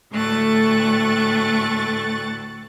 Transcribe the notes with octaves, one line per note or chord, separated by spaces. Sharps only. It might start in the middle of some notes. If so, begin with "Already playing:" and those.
D2 A2 A3 C#6 F#6 A6